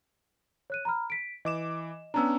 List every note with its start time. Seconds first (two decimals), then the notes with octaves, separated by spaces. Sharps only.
0.70 C#5 F#6 D#7
0.85 A#5 B5 F6
1.10 B6 D7
1.45 E3 D#5 D6 E7
2.14 B3 C#4 D4 A#5 E6